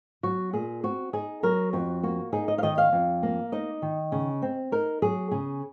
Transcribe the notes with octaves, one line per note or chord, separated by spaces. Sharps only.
F#3 F#4
A#2 G#4
C4 F#4
D#4 G#4
F#3 A#4
F2 F#4
A#3 F#4
D#4 G#4
D#5
F5
D#3 D#5
F5
F2
A#3
D#4 D#5
D#3
C#3
C4
D#4 A#4
F#3 G#4
C#3 G#4